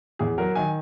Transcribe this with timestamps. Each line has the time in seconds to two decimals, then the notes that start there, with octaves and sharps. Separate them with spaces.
0.19 E2 G#4
0.38 F#3 A#4
0.55 D#3 G#5